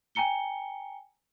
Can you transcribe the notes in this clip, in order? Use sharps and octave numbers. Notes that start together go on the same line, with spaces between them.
G5 G#5 A#5 C#7 G7